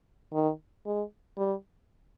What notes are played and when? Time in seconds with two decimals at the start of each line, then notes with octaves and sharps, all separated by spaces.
0.33 D#3
0.86 G#3
1.38 G3